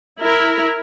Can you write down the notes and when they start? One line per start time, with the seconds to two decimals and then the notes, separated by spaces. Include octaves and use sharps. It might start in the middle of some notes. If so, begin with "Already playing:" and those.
0.19 E4 A#4